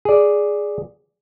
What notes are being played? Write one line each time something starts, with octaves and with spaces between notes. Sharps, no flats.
G#4 D5